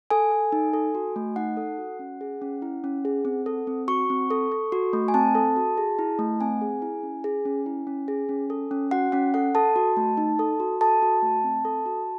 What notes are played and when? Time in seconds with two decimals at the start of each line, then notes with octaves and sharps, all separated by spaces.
0.10 A4 G#5
0.32 A4
0.52 D#4
0.73 A4
0.95 F#4
1.16 A3
1.36 D#4 F#5
1.57 A4
1.78 F#4
1.99 C#4
2.21 G#4
2.42 C#4
2.62 E4
2.84 C#4
3.05 G#4
3.25 C4
3.46 A4
3.67 C4
3.88 F#4 C#6
4.10 C4
4.31 A4
4.52 A4
4.72 F#4
4.93 A3
5.08 G#5
5.14 C4 A5
5.35 A4
5.56 F#4
5.77 G#4
5.99 E4
6.19 A3
6.41 C4 G#5
6.61 G#4
6.82 E4
7.03 C#4
7.24 G#4
7.45 C#4
7.66 E4
7.87 C#4
8.08 G#4
8.29 C#4
8.50 A4
8.71 C#4
8.91 F#4 F#5
9.12 C#4 F#5
9.34 A4 F#5
9.55 A4 A5
9.76 F#4
9.97 A3
10.17 D#4
10.39 A4
10.60 F#4
10.81 A4 A5
11.02 F#4
11.22 A3
11.44 C4
11.65 A4
11.86 F#4